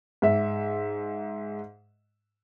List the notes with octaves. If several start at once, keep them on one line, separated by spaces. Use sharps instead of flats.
G#2 E5